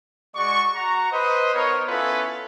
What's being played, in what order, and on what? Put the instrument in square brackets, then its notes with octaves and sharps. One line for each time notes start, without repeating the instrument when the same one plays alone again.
[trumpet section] G#3 F#4 D5 C#6
F#4 A#5 C#6
B4 C5 D#5
B3 D#4 A#4 C#5
B3 C#4 E4 F4 A4 B4